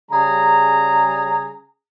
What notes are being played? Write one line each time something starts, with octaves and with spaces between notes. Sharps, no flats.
C#3 G3 G#4 A#5